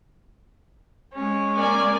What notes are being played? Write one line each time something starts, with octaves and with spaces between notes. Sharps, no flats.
G#3 C#4
A#3 D5 G#5